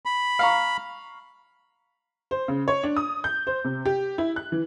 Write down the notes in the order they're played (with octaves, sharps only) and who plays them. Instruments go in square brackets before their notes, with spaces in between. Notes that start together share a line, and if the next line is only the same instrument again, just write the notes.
[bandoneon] B5
[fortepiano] F5 A#5 C#6
[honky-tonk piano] C5
C#3
C#5
D4
D#6
G6
C5
C3
G4
E4
F#6
E3